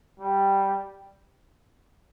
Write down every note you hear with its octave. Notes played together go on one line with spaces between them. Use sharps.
G3